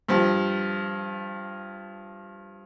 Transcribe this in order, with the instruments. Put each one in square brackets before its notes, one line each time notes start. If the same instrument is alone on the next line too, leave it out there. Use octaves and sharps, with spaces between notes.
[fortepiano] G2 F3